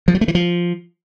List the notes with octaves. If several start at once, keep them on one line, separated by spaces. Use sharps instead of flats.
F3
F#3
A3
E3
F3